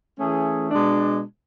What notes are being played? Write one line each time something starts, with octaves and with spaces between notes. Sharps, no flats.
E3 A3 C#4 G#4
B2 G#3 D4